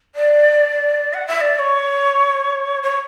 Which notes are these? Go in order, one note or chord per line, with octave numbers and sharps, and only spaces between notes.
D5
F#5
E5
D5
D5
C#5
C#5